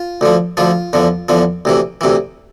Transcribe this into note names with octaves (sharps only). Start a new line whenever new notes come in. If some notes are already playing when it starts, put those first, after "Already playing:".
Already playing: F4
D2 D3 F3
D2 D3 F3 F4
E2 D3 F3
E2 D3 F3
D2 C3 E3
D2 C3 E3